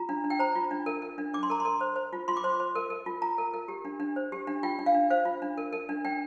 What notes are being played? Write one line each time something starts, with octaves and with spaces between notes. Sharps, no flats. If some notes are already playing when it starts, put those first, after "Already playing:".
Already playing: F4 A#5
D4
D4
G5
C5 A#5
F4
D4
A#4
A#4
D4
D4 D6
C6
A#4 A#5
C6
A#4
C5
C5
F4
F4 C6
D6
C5 C6
C5
A#4
A#4
F4
F4 A#5
A#4
A#4
G4
D4
D4
C5
G4
D4
F4 G5
D4
F5
D4
C5 F5
F4
D4
A#4
A#4
D4
D4 G5